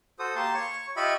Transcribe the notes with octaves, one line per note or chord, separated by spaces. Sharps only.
F#4 A4 C5 D#6
A#3 G4 A5 C6
C#5 C#6
F4 G4 D#5 E5 B5 C#6